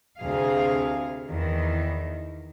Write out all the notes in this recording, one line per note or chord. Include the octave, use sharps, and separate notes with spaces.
D2 C3 G#4 F5
E2 D#3 E3